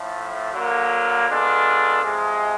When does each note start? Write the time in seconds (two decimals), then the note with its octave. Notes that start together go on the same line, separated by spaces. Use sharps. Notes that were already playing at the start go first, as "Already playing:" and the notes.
Already playing: A2 F3 A3
0.54 D3 F#3 A#3
1.28 G#3 B3 D4 F4 A4
2.02 C3 F3 G#3